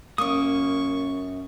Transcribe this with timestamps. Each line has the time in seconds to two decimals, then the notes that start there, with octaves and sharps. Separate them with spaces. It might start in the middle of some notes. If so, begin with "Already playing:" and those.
0.18 F#2 A#3 C#4 C#6 D#6